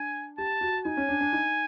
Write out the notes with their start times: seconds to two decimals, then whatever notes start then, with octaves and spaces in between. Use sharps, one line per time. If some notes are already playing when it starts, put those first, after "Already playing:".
Already playing: D4 G#5
0.37 G4 A5
0.61 F#4
0.85 D#4 G#5
0.97 C#4
1.09 D4
1.21 D4
1.33 D#4